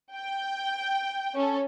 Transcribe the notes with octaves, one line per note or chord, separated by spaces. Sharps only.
G5
C#4 A4